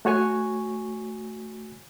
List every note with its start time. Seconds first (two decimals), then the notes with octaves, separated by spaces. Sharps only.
0.05 A3 F#4 C#5 G#5 C#6